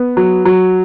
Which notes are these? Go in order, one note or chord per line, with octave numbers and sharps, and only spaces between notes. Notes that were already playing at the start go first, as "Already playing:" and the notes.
Already playing: B3
F#3
F#3